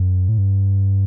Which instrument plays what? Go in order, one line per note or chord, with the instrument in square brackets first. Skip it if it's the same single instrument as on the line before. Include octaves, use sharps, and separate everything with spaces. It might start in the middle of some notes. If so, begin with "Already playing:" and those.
Already playing: [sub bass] F#2
A2
G2